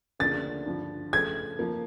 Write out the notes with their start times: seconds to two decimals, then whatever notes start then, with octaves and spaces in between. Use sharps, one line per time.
0.19 D2 C#3 F3 A#3 D4 A6
0.66 G2 D3 F3
1.13 C#3 F3 A3 G#6
1.59 F3 A#3